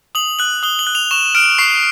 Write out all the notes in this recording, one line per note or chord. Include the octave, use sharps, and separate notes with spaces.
D#6 F#7
F#6 F#7
D#6 G7
F#7
F#6
F7
C#6 E7
F6 D7
C#6 C7